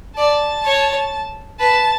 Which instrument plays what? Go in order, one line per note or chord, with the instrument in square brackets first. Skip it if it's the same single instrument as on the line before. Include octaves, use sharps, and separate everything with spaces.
[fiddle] D5 [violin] A5
[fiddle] C#5
[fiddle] B4 [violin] A5